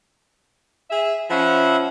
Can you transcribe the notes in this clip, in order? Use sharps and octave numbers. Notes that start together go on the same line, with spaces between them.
G#4 E5
F3 C#4 E5 F#5 B5